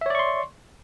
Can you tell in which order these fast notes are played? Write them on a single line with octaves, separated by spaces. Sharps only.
E5 C#5 D5 C#6 C6